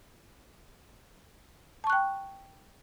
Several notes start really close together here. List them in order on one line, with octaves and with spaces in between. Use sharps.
A5 C#6 F#6 G5